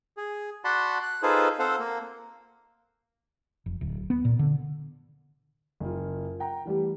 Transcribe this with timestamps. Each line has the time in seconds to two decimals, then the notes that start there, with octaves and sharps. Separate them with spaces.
0.17 G#4
0.64 F#4 D5 F#5 A5 B5 C6
1.03 F#6
1.23 D#4 F4 G#4 A4 B4 C5
1.59 C4 A4 C5 F5 F#5
1.79 A#3
3.66 F1
3.81 D1
4.10 B3
4.25 A#2
4.39 D3
5.80 F#1 F4
6.40 F#5 G5 A#5
6.65 E3 G3 A3 G4